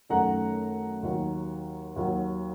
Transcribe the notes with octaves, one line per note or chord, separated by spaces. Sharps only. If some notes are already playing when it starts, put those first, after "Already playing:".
F#2 D#3 A3 F#5 A#5
D#2 D#3 F#3
D#2 D#3 F#3